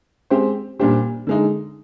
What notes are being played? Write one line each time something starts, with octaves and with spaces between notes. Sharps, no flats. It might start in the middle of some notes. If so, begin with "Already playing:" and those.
G#3 C4 G4 C5
A#2 G3 D4 G4 C5
D3 G#3 D#4